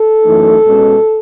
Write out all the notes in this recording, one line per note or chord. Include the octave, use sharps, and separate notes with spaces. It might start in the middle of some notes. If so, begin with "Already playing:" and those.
Already playing: A4
F#2 E3 A3 D#4
B2 G#3 C#4